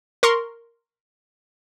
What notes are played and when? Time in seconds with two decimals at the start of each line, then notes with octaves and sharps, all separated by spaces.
0.23 A#4 C6 C#6